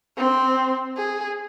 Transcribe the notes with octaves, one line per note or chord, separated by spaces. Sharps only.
C4
G#4